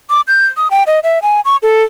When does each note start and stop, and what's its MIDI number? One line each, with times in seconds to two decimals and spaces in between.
0.10 0.21 86
0.28 0.46 91
0.57 0.68 87
0.71 0.83 79
0.87 1.00 75
1.03 1.19 76
1.22 1.41 80
1.45 1.56 85
1.63 1.83 69